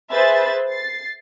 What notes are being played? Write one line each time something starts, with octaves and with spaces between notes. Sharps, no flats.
G#4 B4 C5 E5 A6
A6 C7